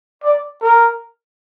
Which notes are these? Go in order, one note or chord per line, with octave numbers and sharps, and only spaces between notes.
D5
A#4